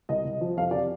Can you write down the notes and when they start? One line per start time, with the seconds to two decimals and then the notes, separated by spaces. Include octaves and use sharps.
0.09 C2 D#5
0.25 C2
0.41 F3
0.57 F2 F5
0.71 C3 D5